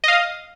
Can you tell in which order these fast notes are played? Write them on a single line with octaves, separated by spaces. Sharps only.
D#5 F5 D#6